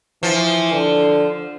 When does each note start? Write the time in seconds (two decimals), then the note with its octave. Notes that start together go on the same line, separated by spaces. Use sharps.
0.23 E3 F3
0.72 D3